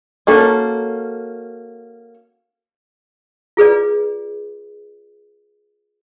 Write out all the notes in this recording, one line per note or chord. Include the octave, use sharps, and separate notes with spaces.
A#3 C#4 F#4 A4
F4 G#4 B4 D5